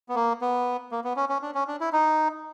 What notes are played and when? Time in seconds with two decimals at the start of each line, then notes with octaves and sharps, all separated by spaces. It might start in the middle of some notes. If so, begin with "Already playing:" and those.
0.09 B3
0.15 A#3
0.41 B3
0.92 A#3
1.04 B3
1.16 C#4
1.29 C#4
1.42 D4
1.55 C#4
1.67 D4
1.81 E4
1.93 D#4